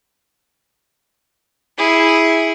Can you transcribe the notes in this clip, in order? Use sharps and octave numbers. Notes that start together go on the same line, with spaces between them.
E4 G#4